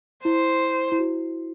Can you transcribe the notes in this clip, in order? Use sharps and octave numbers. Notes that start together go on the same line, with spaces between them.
E4 C5
E4
F#4